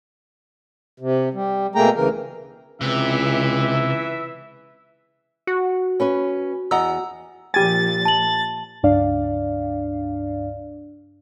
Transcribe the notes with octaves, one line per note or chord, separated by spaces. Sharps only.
C3
G3
B2 A3 A#3 G#4 G5 A#5
D2 C#3 E3 A#4
C#2 C3 E3 E5
F#4
C#4 B4 C#5
E2 D#5 F#5 A#5 E6
A#2 F3 G4 G#5 A6
A5 F#7
C#2 G2 D4 D5 F5